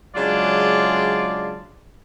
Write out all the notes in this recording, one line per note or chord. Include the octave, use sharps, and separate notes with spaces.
C#3 F#3 G#3 D4 F4 D5